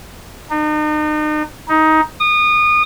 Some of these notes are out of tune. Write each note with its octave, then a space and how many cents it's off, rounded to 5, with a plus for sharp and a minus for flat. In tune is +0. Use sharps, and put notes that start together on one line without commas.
D#4 -40
D#4 +15
D#6 -30